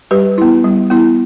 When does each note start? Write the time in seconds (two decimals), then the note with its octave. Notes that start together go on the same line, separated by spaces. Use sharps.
0.11 G3 G4 B4
0.38 B3 E4
0.64 G3
0.90 B3 E4